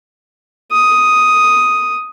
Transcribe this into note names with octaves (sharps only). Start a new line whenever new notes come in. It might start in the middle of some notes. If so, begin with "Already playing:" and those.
D#6